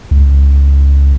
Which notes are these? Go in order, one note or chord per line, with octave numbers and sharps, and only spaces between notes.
C#2